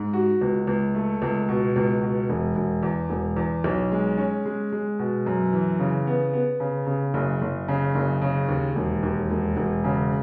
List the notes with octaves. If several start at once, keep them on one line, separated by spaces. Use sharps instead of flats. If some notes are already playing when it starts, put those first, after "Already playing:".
Already playing: G#2
F#4
C#2
C#2
A3
C#2
B2
C#2
B2
E1
E1
E2
E1
E2
B1
G#3
C#4
G#3
G#3
B2
F#2
E3
C#3
B3
B3
C#3
C#3
F#1
F#1
C#3
F#1
C#3
D#2
E1
D#2
E1
E1
C#3